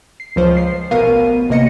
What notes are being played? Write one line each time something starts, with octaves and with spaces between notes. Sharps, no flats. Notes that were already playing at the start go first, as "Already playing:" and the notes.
C7
C#2 F3 C5
C7
A1 B2 B3 A#4 F5 D#7
A1 C3 A#3 D#5 A#6 C#7